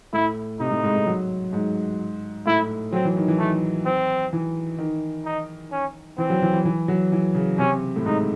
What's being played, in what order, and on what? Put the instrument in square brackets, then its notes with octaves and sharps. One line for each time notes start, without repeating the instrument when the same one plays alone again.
[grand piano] A2 [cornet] E4
[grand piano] C3 [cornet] D#4
[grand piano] A2
G#2
A2
F#3
G#2
[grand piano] A2 [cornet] E4
[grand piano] F#3 [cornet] C4
[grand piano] E3
D#3
E3
[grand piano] D#3 [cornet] A3
[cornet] C4
[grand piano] E3
D#3
[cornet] D#4
C#4
[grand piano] E3 [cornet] C4
[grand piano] F#3
E3
E3
E3
F#3
E3
C#3
[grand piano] C3 [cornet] C#4
[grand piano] A2
[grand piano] G#2 [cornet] D#4